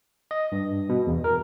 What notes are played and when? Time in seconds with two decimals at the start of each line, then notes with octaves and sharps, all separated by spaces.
0.31 D#5
0.52 G2
0.89 B2
1.07 E2
1.24 A#4